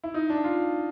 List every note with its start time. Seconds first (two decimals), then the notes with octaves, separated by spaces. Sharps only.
0.04 E4
0.14 D#4
0.30 D4
0.44 F4